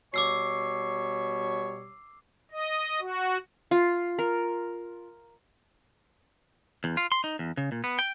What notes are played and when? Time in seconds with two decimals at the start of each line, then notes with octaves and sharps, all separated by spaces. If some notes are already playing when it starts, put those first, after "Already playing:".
0.14 B2 G3 C#5 D6 E6 C7
2.51 D#5
3.01 F#4
3.71 F4
4.19 A#4
6.84 E2
6.97 F4
7.12 C6
7.24 D#4
7.39 E2
7.57 C#3
7.72 A#2
7.84 B3
7.99 G5